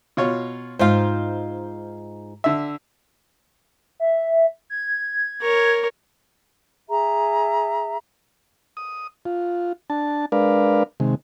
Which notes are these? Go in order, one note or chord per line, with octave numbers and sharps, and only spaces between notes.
B2 F4 C#5
G#2 D#4 F4 C5 F5
D3 E5
E5
G#6
A#4 C#5
G#4 E5 A#5
D#6
F4
D4 A5
G#3 D4 A#4 B4 D5 F5
C3 D#3 G#3